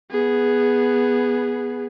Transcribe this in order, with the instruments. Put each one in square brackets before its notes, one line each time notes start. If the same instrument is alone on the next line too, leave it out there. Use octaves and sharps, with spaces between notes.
[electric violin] B3 G#4